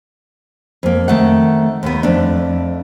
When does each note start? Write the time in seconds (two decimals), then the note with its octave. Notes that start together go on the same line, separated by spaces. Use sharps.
0.83 F2 A#3
1.08 D#3 A3 F#5
1.83 D#2 D#3 B3
2.03 F2 A3 D4